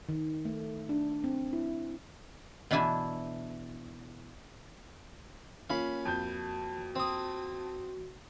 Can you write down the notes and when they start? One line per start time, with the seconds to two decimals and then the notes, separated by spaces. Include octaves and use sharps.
0.09 D#3
0.45 A3
0.89 D4
1.24 C4
1.53 E4
2.71 B2 E3 D4 E4 G#5 A5
5.70 A#3 C#4 F4 F5 B5
6.05 F2 F#4 G6
6.96 C4 D#6